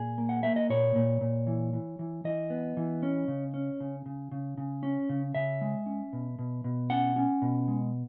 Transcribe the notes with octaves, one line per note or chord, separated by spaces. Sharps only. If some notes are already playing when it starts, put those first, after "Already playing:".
Already playing: A#2 G#4
A#3
F#5
A#3 E5
D#5
A#2 C#5
A#2
A#2
E3
E3
E3
E3 D#5
B3
E3
C#4
C#3
C#4
C#3
C#3
C#3
C#3
C#4
C#3
C#3 E5
G#3
C#4
B2
B2
B2
C#4 F#5
C#4
B2
G#3